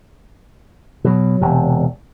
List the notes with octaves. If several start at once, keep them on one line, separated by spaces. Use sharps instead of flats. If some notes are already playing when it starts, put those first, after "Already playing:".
B2 F#3
E1 C3